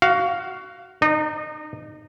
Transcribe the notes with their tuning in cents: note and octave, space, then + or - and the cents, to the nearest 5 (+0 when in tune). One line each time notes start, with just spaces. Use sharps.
F#4 +20 F5 +0
D#4 -25 D5 +45